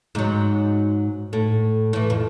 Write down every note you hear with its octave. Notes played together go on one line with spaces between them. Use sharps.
G#2 F#3
A2
A2 E3
F2